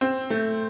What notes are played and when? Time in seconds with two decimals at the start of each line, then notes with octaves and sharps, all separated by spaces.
0.01 C4
0.30 A3